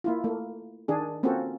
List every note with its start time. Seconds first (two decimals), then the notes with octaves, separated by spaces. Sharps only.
0.04 A#3 E4 F4
0.24 A3 A#3
0.88 D#3 D4 G#4
1.23 A#3 C4 C#4 F4 F#4 A4